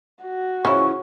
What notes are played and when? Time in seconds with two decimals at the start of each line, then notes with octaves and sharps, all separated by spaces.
0.23 F#4
0.65 C#3 E3 F3 C#4 E4 C#6